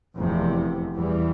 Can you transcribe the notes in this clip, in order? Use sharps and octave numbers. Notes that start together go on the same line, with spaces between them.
F1 E2 C3
E2 E3 G3